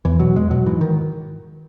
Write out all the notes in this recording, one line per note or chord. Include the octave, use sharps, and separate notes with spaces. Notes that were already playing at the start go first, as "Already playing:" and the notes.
E2 E3
B2 F#3
E2 G#3
B2 F#3
G#2 E3
D#3